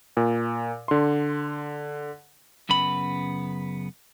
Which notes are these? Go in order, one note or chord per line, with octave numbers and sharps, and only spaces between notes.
A#2
D3 C6
F#2 C#3 B3 B5